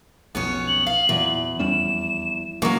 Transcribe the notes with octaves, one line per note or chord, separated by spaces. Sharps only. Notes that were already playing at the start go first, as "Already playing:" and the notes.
B1 F2 B3 C#4 C#5
F#7
F5
E2 A#2 E3 F#3
F2 G3 C#4 E7
C#3 E3 F#3 G#3 A#3 C#6